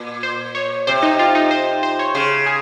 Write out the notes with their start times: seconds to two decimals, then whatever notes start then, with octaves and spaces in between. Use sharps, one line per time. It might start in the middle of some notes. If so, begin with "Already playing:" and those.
Already playing: A#2
0.23 C5
0.55 C#5
0.87 C3 C5
1.03 D#4
1.19 F4
1.35 D#4
1.51 C5
1.83 C5
1.99 C#5
2.15 C#3 C5
2.46 G#4